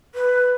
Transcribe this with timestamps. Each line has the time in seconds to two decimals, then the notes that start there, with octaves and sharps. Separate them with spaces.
0.15 B4